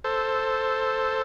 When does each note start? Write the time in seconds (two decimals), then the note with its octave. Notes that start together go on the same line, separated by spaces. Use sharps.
0.04 A4 C5